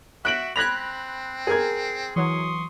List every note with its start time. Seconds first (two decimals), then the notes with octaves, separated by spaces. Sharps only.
0.25 F#4 E5 F#6 D7 F#7
0.56 C4 B5 F#6 G#6 A#6 F7
1.47 G#4 A#4 G#6
2.16 E3 F#3 C6 C#6 D#6